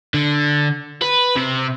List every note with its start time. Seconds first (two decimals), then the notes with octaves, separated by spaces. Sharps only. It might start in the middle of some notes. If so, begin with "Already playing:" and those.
0.14 D3
1.02 B4
1.36 C3